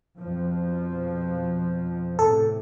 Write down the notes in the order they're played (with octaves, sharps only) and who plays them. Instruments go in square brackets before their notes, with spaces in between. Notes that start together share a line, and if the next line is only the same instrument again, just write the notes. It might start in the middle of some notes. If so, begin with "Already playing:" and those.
[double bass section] F2 B2 F3
[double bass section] E2 A2 C3 [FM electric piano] A4